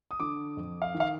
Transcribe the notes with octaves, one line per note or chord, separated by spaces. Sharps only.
D#6
D3 D6
F2
F5
D#3
F5